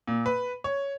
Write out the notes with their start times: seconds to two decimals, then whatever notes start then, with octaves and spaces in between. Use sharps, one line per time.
0.08 A#2
0.26 B4
0.64 C#5